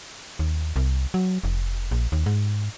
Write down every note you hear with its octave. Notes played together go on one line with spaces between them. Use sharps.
D#2
C2
F#3
F1
A#1
D#2
G#2